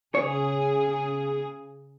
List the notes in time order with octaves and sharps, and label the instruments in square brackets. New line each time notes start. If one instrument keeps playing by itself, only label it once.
[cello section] C#3 G#4 [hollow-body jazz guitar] C#5